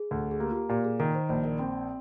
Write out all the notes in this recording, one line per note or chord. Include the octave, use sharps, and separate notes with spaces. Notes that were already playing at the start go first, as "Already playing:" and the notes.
Already playing: G#4
D2
G#4
A#3 G4
F4
G4
A#2 G4
G#4
D#3 A#4
C5
A#1 C5 D#5
A#4 D5
C4 C5